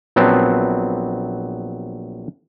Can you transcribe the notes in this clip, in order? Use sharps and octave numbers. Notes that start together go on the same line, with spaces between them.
A#1 F#3 B3 C4 A5